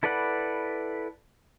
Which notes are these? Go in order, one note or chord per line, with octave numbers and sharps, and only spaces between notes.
E4 A4 B4 D5 F#5